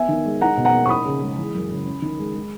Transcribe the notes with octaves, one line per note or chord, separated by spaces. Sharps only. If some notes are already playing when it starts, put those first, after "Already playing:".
Already playing: B3 E5 G#5
D#3
G#3
D#4 F#5 A#5
B2
F#5 A#5
A#3
C#6
D#4 B5 D#6
C#3
G#3
E3
F#2
C#3
C#4
D#3
G#3
G#3